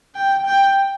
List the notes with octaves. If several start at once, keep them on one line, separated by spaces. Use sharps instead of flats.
G5
G5